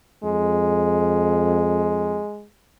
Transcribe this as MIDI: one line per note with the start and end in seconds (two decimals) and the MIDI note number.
0.24 2.19 41
0.24 2.46 56